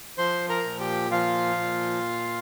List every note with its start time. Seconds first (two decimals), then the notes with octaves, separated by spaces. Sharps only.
0.18 F3 C5 C6
0.49 A#4 A#5
0.64 A#2
0.80 G4 G5
1.11 F3 F4 F5
1.58 A#2